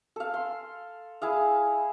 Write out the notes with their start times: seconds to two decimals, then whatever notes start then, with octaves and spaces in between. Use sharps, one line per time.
0.16 A4 F5
0.34 C6
1.22 E4 G#4 F5